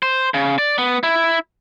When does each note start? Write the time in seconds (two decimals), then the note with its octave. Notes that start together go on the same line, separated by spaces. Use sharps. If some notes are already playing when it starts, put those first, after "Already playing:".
0.03 C5
0.34 C#3
0.58 D5
0.78 B3
1.03 E4